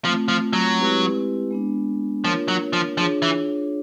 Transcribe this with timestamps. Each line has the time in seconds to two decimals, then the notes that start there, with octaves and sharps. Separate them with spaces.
0.04 F3 A3 C4 F4
0.28 F3
0.53 F#3
0.78 G#3 C4 E4 G4 B4
1.51 G#3 B3 D4
2.24 F3 A#3 D4 F4 A#4 C#5
2.48 F#3
2.73 F3
2.98 F3 D4 F4 G#4 C#5
3.22 E3